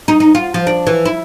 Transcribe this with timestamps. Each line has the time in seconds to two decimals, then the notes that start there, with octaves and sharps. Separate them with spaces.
0.08 D#4
0.20 D#4
0.35 F4
0.54 F3
0.67 D4
0.87 E3
1.05 E4